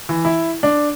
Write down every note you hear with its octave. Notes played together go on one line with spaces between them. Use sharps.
E3
E4
D4